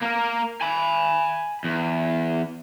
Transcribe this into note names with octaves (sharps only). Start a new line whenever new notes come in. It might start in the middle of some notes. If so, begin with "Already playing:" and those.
A#3 A#4
G#5 B5
E2